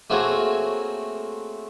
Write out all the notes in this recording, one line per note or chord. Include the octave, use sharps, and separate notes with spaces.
A3 A#3 C4 F#4 G#4 C#5